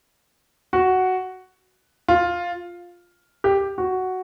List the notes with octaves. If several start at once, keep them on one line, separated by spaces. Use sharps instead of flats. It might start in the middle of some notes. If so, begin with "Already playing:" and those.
F#4
F4
G4
F#4